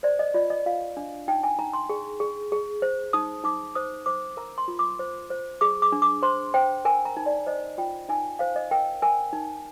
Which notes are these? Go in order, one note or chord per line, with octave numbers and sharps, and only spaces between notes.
C5 D5
D#5
F4 D5
D#5
F4 F5
D4
D#4 G5
G#5
D#4 A#5
C6
G#4
G#4
G#4
C5
D#4 D#6
D#4 D6
C5 D#6
C5 D6
A#4 A#5
C6
F4
D6
C5
C5
G#4 D6
D6
D4
D6
C5 C6
C5 G5
A#4 G#5
A#5
D#4
D5
C5 D#5
F4 G5
D#4 G#5
C5 F5
D#5
A#4 G5
A#4 G#5
D#4